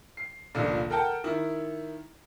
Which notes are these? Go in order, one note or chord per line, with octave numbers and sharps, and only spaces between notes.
C7
F1 C#2 A#2 D3
A4 A#4 F#5 G5 A5
D#3 E4